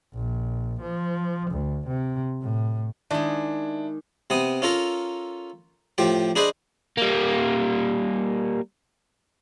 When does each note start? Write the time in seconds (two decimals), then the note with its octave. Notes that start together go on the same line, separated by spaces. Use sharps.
0.14 A#1
0.81 F3
1.51 D2
1.87 C3
2.41 A2
3.11 D#3 G#3 D4 E4
4.30 C3 B3 D#6
4.62 C#4 F4 A4 A#4 A#5
5.98 A2 F3 G4 G5
6.36 D4 G#4 B4 C5 D5 D#5
6.97 G3 A#3